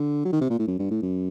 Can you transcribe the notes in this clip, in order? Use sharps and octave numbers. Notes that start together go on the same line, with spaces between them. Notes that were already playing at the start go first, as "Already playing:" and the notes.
Already playing: D3
F#3
D#3
C3
A#2
A2
F#2
G2
A2
F#2